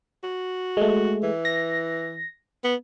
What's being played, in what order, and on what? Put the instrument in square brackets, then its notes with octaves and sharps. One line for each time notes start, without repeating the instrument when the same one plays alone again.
[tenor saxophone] F#4
[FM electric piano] G#3 A3
[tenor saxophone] E3
[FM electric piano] A#6
[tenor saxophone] B3